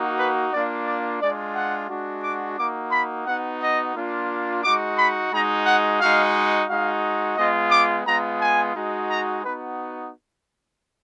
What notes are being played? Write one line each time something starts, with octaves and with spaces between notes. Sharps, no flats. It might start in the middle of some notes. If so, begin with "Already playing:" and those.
Already playing: A#3 D#4 F#4
B4
A#3 D4 F4 D5
D5
G#3 D4 F4 D5
F#5
G#3 D4 F#4
D6
A#3 D#4 F#4 D6
B5
B3 D#4 F#4 F#5
D#5
A#3 D4 F4
G#3 D#4 F#4 D6
B5
G#3 D#4 F#4 A#5
F#5
G#3 D#4 F#4 F5
G#3 D#4 F#4 F5
G#3 B3 F4 D#5
D6
G#3 B3 F4 A#5
G#5
G#3 D#4 F#4
A#5
B3 D#4 F#4 B4